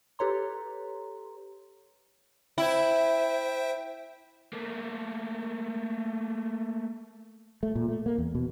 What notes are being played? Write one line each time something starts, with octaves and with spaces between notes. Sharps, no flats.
G4 A4 B4 C#5 A#5 C6
E4 C5 E5 G5
A3 A#3
A3
A#2
A3
A#3
E2
B2